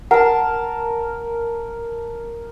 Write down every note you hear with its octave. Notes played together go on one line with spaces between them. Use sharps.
A#4 F#5 A5